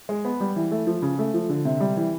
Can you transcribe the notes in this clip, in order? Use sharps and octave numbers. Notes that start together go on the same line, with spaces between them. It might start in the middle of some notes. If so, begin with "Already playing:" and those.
G#3
B3
G3
E3
A3
F3
C#3
A3
F3
D3
C3
G3
E3